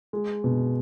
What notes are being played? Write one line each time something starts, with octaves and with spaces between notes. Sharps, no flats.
G#3
B2